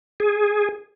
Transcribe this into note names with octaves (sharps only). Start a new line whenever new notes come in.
G#4